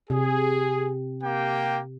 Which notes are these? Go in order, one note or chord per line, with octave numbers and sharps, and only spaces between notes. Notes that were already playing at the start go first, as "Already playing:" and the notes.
C3 G#4
A#3 G4 G5